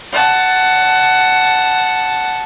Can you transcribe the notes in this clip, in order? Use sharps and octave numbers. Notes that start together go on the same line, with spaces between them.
F#5 A5